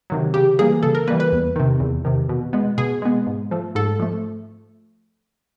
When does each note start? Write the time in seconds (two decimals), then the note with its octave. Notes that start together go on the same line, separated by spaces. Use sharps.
0.10 C3 D#3 F#3
0.34 C#3 G4
0.59 E3 G3 A#3 G#4
0.83 C#3 A4
0.95 A#4
1.08 E3 G3 A#3 B4
1.20 B4
1.32 E2
1.56 C3 D#3
1.80 E2
2.05 C3 D#3
2.29 B2
2.53 G#3 B3
2.78 B2 G#4
3.02 G#3 B3
3.27 G#2
3.51 F3 A3
3.75 G#2 A4
4.00 F3 A3